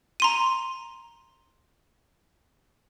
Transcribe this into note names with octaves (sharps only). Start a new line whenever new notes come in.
A#5 C6 D#7